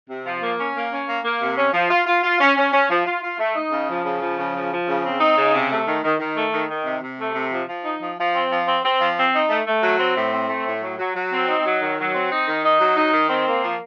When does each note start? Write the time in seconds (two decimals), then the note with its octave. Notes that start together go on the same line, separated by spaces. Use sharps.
0.09 C3
0.26 F3
0.41 A#3
0.59 C#4
0.75 A#3
0.91 C#4
1.08 A#3
1.25 A#3
1.41 C3
1.57 C#4
1.73 F3
1.91 F4
2.06 F4
2.23 F4
2.41 C#4
2.57 C#4
2.73 C#4
2.90 F3
3.06 F4
3.23 F4
3.39 A3
3.55 D#4
3.72 C#3
3.89 F3
4.05 C#3
4.21 F3
4.39 C#3
4.55 F3
4.71 F3
4.88 C#3
5.04 C4
5.21 D#4
5.37 C#3
5.54 C3
5.71 A3
5.87 D#3
6.04 D#3
6.20 D#3
6.36 A3
6.53 D#3
6.70 D#3
6.86 C3
7.02 C3
7.19 A3
7.35 C3
7.52 F3
7.69 F3
7.85 D#4
8.02 F3
8.18 F3
8.34 C4
8.51 F3
8.67 C4
8.84 C4
9.00 F3
9.17 C4
9.34 D#4
9.50 A3
9.66 A3
9.83 F#3
9.99 C4
10.16 A2
10.33 C4
10.49 A3
10.66 A2
10.82 F#3
10.99 F#3
11.16 F#3
11.32 C4
11.48 D#4
11.65 F#3
11.81 D#3
11.98 F#3
12.14 C4
12.31 D#4
12.47 D#3
12.64 D#4
12.81 F#3
12.97 D#4
13.13 D#3
13.30 C4
13.47 A#3
13.63 F3